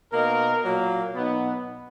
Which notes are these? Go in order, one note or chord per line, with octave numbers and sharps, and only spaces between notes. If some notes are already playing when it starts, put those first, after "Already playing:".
B2 A#3 D#4 A#4
A#2 F#3 A#3
B2 F#3 B3 D#4